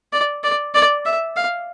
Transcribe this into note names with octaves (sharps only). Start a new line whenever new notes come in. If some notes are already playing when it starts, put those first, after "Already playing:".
D5
D5
D5
E5
F5